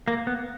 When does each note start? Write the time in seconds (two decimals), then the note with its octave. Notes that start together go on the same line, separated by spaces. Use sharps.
0.08 A#3
0.27 B3